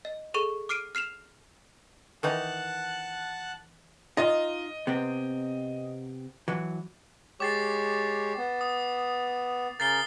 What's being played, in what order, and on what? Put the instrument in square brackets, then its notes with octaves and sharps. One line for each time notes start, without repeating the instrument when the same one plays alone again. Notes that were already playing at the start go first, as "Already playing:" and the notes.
[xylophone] D#5
G#4 A4 C#6 D#7
D6 F6 C7 D7 D#7
F6 C7 E7 F7
[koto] D#3 E3 D#4 [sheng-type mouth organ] F#5 A5 F#6
[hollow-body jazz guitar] D#4 F4 [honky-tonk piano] D#5
[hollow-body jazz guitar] C3 B3 C4
E3 F#3
[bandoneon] G#3 G4 C#5 [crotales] D6 A6 C7
[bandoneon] B3
[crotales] D#6
[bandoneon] C#3 A#4 G6 [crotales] A6 C7 G7